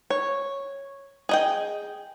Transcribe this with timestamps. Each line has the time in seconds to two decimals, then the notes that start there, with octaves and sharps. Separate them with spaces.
0.10 C#5
1.29 G#4 D#5 G5